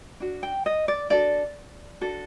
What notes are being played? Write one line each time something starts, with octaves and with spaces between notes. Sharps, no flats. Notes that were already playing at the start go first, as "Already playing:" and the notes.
D4 F#4
G5
D#5
D5
D4 F#4 A4 D5
D4 F#4 A4